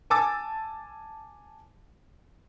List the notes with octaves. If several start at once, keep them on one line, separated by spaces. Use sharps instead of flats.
G#5 A5 D6 E6 A6